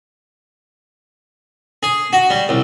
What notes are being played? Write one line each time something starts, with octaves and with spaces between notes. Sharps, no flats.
G#4
F#4
G3
C2